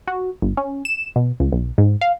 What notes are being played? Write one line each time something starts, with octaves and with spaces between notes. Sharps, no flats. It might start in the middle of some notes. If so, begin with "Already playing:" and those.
F#4
G1
C#4
E7
B2
C#2
B1
G#2
F5